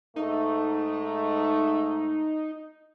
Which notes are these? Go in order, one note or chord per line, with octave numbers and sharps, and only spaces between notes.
G#2 A3 D#4